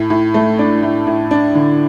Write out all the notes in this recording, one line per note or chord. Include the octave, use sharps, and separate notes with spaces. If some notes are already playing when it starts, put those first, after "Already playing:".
Already playing: A2
A2
A3
D4
A2
A2
D4
D3